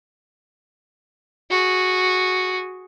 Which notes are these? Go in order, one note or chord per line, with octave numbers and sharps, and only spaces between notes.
F#4 G#4